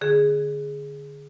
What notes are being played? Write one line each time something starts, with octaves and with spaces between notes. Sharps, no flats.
D3 G#4